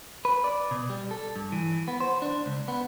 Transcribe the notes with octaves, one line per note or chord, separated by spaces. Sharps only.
B4
D5
B2
G3
A4
G2
E3
B3
C5
D4
C#2
B3